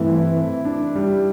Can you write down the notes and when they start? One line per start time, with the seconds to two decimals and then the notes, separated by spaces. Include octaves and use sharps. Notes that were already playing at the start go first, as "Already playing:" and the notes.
Already playing: G2 E3 A3 C4 E4
0.65 D4
0.95 G3